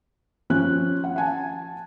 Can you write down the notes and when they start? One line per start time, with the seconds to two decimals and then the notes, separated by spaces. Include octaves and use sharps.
0.50 F3 C#4 F#6
1.04 F#5
1.16 F#5 G#5 A5